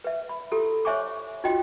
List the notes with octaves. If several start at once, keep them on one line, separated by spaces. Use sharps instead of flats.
B4 E5
B5
E4 G4 A4
C5 C#5 E5 G#5 C#6 D6
D#4 F4 F#4 D#5 G5